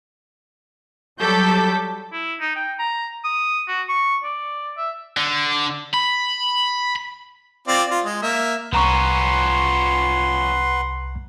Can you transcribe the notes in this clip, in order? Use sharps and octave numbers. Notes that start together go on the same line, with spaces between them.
F#3 G3 A4 D6 G6 B6
E4
D#4
G5
A#5
D#6
F#4
C#6
D5
E5
D3
B5
C4 F4 D5
F4
G#3
A#3 E5
C2 F3 C#4 B4 F#5 A#5 C6 C#6